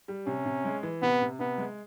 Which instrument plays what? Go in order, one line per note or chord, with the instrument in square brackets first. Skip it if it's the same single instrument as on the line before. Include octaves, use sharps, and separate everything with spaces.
[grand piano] G3
[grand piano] C3 [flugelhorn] C#4
[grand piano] C3
G#3
E3
[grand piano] C3 [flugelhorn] B3
[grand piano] C3
[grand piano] C3 [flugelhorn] B3
[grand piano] G#3